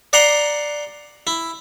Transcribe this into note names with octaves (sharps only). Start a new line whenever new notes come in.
D5 F#5 A#5 C6
E4